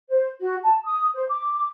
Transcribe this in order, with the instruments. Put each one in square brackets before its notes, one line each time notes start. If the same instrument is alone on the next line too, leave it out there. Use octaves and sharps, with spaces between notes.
[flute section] C5
F#4
A5
D#6
C5
D6